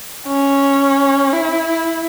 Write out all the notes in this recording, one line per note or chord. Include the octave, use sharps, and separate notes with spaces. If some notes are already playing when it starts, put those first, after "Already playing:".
C#4
E4